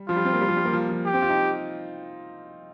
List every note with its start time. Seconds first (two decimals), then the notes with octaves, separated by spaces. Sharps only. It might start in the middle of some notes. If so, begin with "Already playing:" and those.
Already playing: G3
0.09 F3 F4
0.16 G3
0.25 C4
0.33 A#3
0.41 G3
0.48 F3
0.56 G3
0.65 A#3
0.73 F3
0.89 F3
1.06 G4
1.13 C4
1.22 F4
1.29 D#4